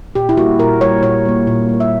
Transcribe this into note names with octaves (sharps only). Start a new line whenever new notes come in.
A#2 G4
E4
G3 A#3 F#4
A#2 A#4
G3 A#3 C#5
A#2 C#5
G3 A#3
A#2
G3 A#3
E5